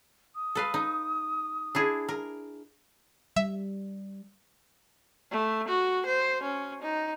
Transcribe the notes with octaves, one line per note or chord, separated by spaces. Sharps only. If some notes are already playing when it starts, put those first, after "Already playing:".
D#6
A4 B4 F5
D#4
D4 E4 G#4
A#4
G3 E5
A3
F#4
C5
C#4
D#4